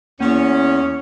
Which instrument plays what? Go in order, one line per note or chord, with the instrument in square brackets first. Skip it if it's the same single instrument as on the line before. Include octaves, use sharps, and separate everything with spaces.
[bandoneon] E2 [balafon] A#3 [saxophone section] C#4